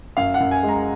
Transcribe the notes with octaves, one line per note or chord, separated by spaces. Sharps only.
F#2 F5
F#5
F#2
G#5
G#3
A#5